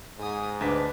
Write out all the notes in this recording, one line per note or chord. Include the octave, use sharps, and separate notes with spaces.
G#2 G#5 D#6
D2 D4 B4 B6